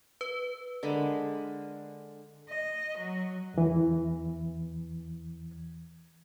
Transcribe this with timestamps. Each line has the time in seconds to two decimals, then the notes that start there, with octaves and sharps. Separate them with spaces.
0.21 B4
0.83 D3 G#3 A#4 B5
2.48 D#5
2.97 F#3
3.54 E2 E3